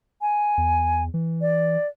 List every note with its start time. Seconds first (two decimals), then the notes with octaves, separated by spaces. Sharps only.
0.21 G#5
0.58 E2
1.14 E3
1.41 D5